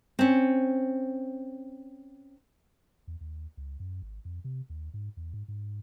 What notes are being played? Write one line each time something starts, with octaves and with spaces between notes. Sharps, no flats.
C4 C#4
E2
D#2
C#2
F#2
G#1
F2
C3
D#2
G#2
E2
G#2
G#2